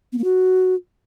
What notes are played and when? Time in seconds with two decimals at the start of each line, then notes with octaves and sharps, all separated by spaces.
0.13 B3
0.18 A#3
0.24 F#4